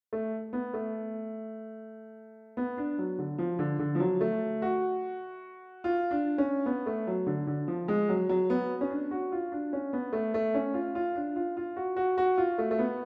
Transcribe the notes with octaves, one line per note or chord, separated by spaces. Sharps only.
A3
B3
A3
B3
D4
F#3
D3
F3
D3
D3
F3
F#3
A3
F#4
F4
D4
C#4
B3
A3
F#3
D3
D3
F3
G#3
F#3
F#3
B3
C#4
D4
F#4
F4
D4
C#4
B3
A3
A3
C#4
F4
F4
D4
F4
F4
F#4
F#4
F#4
F4
A3
A3
B3